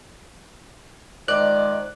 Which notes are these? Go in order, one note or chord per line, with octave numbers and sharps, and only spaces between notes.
D#3 F3 G#3 D5 F#6